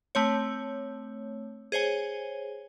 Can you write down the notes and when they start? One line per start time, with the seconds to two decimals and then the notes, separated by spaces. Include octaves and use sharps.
0.15 A3 C4 C#5
1.72 G#4 C5 C#5 G#5